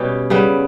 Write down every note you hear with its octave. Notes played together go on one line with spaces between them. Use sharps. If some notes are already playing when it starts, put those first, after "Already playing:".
Already playing: B2 G3 C#4 G4
C#3 G3 B3